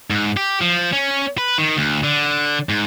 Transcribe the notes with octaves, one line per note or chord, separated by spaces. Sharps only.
G#2
G4
F3
C#4
B4
D#3
D2
D3
G#2